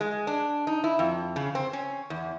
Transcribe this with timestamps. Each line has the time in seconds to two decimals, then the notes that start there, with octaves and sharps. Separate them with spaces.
0.01 G#3
0.27 D4
0.67 D#4
0.84 E4
0.99 F2
1.36 C#3
1.55 C4
1.73 C#4
2.10 E2